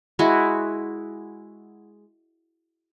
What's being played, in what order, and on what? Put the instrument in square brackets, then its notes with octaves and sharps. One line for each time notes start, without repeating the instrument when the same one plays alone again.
[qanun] G#3 E4 F#4